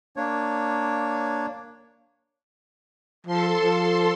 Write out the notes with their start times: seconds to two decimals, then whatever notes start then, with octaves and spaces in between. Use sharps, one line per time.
0.16 A#3 D4 C#5
3.27 F3 A4 C6
3.58 F3